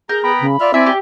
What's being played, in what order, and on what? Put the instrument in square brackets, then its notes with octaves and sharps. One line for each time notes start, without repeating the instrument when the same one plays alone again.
[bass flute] G#4 [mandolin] A#4 [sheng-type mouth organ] A#5 [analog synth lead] G6
[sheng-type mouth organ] B3 G5 A#5 [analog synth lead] B5
[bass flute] C#3
[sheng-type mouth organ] F4 E5 F6 [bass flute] D5
[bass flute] C4 [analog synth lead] E4 [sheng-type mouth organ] D5 G#5 [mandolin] E5
[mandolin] G4 D6